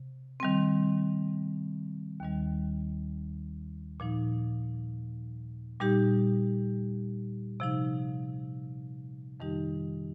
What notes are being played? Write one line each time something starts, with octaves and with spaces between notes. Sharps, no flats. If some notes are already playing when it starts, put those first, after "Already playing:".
Already playing: C3
D#3 G3 C4
D#2 D#3 G3
A#2 F3 D#4
A#2 G3 D#4 G4
C3 F3 D#4
F2 D#3 G3 D#4 G4